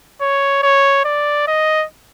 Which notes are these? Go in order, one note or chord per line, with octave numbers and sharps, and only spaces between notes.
C#5
C#5
D5
D#5